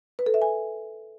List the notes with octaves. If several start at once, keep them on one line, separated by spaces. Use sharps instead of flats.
B4
A4
E5
G#5